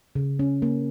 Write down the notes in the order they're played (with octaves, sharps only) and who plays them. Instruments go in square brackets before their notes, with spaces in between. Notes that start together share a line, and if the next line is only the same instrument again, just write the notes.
[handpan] C#3
C#4
A#3